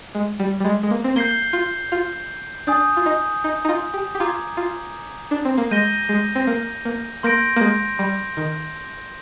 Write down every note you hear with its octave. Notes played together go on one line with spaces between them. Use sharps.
G#3
G3
G3
G#3
G#3
A#3
C4
A#3 G6 C7 G7
F4
F4
D4 G#5 D#6 G6
F4
D#4
D#4
D#4
F4
G4
G4
F4 A#5 D6 G#6
F4
D4
C4
A#3
G#3 G6 A#6 D#7 G7
G#3
C4
A#3
A#3
A#3 C6 G6 A#6 D7
A#3
G#3
G3
D#3